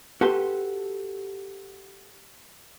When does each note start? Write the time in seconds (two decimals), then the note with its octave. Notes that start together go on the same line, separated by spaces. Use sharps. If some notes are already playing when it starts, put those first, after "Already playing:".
0.21 F#4 G4 A4 B4 C6